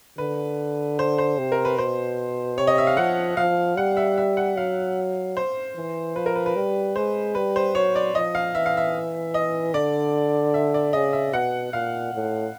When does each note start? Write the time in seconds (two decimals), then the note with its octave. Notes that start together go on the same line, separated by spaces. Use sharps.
0.18 D3 B4
0.99 C5
1.18 C5
1.38 C3
1.52 A#4
1.65 B4
1.77 B2 C5
2.58 C3 C#5
2.67 D#5
2.78 E5
2.87 F5
2.97 F3 F#5
3.37 F3 F5
3.77 G3 F#5
3.97 E5
4.18 E5
4.37 F#5
4.57 F#3 F5
5.37 C5
5.76 E3
6.16 F3 B4
6.26 A#4
6.35 B4
6.46 B4
6.56 G3
6.96 G#3 C5
7.35 G3 B4
7.56 C5
7.75 F#3 C#5
7.96 D5
8.15 F3 D#5
8.35 F5
8.54 E3 E5
8.66 F5
8.77 E5
9.34 D#5
9.74 D3 D5
10.54 E5
10.74 D5
10.93 C#3 D#5
11.13 E5
11.33 B2 F#5
11.73 A#2 F5
12.14 A2